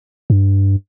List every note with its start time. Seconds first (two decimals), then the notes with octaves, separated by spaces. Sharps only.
0.30 G2